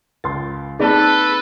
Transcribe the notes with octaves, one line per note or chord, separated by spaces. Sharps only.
C#2 C6 A6
A#3 C4 D#4 G#4 A4 B4 D5 A5